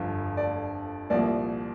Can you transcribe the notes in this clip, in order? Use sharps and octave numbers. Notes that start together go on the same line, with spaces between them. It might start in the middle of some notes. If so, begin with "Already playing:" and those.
Already playing: G1 F2 D3 F3
D5
C2 A#2 F3 D5